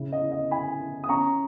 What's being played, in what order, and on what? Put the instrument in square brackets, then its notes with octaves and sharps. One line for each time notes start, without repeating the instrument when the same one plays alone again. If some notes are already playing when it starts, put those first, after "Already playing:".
Already playing: [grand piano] C#3 E4
D#5
E4
D#5
E4 G#5 B5
E4
D#6
C#4 A#5 C#6